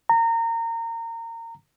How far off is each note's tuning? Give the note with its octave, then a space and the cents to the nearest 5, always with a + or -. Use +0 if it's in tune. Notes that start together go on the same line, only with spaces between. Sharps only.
A#5 -25